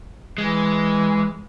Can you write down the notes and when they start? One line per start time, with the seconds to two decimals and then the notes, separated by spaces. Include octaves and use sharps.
0.38 E3 G#3